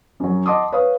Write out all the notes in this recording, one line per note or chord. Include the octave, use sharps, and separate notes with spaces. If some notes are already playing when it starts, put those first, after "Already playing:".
F#2 F#3
D#5 F#5 A5 C6 D6 D#6
B4 C#5 F5 D#6